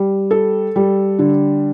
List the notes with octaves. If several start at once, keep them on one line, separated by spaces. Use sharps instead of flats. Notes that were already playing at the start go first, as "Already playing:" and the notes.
Already playing: G3
A4
G3
D3